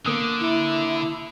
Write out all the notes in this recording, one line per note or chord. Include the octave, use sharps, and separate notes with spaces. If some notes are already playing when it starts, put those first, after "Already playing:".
D3 A#3 D#6
E4